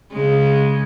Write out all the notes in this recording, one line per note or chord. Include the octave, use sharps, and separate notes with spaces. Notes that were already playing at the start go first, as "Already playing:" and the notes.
C#3 G#3